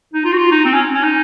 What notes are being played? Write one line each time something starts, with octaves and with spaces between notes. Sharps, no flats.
D#4
F4
F#4
F4
D#4
C4
C#4
C#4
D#4